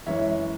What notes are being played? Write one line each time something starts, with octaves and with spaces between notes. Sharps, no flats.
F#2 E3 G#3 C#5 E5